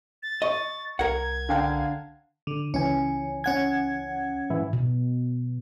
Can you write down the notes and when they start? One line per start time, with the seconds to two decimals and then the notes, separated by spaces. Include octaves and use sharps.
0.23 A6
0.42 D#5 C#6
0.99 C2 A#4 F#5 G#6
1.49 D3 F5 G5
2.47 D3
2.74 C#2 E3 C#4 G#5
3.44 C#4 F#5 G#6
4.50 G#2 E3 E4
4.73 B2